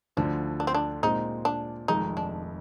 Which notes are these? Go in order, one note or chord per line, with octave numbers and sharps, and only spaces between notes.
D2 D3 F3 D4
D4
C4
D4
A#2 G#3 C4 D#4
D4
F1 F2 D#3 G#3 D#4
D4